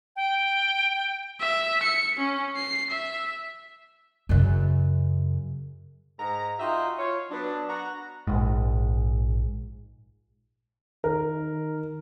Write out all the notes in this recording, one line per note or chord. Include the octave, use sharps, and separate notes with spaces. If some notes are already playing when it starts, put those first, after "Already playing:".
G5
E5
C#7
C#4
C7
E5
F#2 C#3
G#2 A#5
D#4 F4 F#4 E5 G5
F4 C#5
F#3 B3 D4
F#4 F#5 A#5
A#1 G#2
D#3 A#4